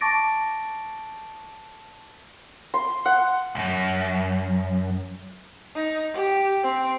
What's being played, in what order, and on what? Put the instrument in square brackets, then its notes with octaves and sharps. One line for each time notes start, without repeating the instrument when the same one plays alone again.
[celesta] A5 C#6 D6 A6 A#6 D7
[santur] C6
F#5
[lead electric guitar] C2 F#2
[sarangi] D#4
G4
C4